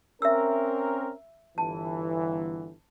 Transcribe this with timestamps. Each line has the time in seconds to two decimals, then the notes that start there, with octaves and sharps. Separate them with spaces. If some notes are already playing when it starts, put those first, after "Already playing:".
0.22 C4 C#4 A#4 E5 E6
1.58 G1 E3 A5